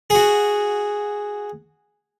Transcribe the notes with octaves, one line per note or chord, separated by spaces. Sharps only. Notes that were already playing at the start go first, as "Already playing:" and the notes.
F#4 G#4